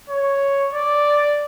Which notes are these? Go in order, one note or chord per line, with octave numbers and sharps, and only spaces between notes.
C#5
D5